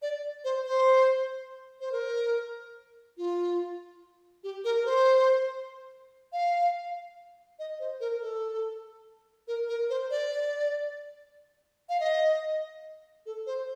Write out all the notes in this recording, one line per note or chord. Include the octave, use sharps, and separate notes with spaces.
D5
C5
C5
C5
A#4
F4
G4
A#4
A#4
C5
F5
D#5
C5
A#4
A4
A#4
A#4
C5
D5
F5
D#5
A4
C5